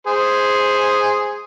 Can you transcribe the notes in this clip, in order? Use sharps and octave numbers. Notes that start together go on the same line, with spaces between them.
G#4 C5